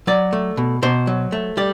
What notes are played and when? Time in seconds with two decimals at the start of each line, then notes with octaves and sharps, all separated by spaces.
0.07 F#3 D5
0.33 A3
0.57 B2
0.82 B2 C5
1.07 F#3
1.32 A3
1.57 G3 D5